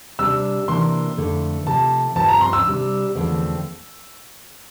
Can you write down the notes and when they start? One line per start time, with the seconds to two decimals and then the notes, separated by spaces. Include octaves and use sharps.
0.19 C3 G3 D4 E6
0.68 C3 E3 A#3 D4 C6
1.17 F2 D3 A3
1.67 C3 F3 A3 A5
2.15 G2 F3 C4 A5
2.28 A#5
2.41 C6
2.53 E6
2.65 C3 G3 D4
3.15 E2 D3 F3 A3 C4